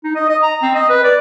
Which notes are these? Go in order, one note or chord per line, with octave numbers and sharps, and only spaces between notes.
D#4
D#5
D#5
A#5
C4
D#5
B4
D5